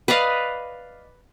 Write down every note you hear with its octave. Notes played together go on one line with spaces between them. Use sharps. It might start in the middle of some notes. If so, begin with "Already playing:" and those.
B4 D5 D#5 F5